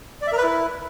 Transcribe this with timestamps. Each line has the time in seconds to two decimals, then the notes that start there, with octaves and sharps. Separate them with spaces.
0.21 D5
0.27 E5
0.32 A#4
0.38 B4
0.43 E4